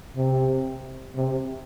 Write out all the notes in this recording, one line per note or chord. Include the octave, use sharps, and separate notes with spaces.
C3
C3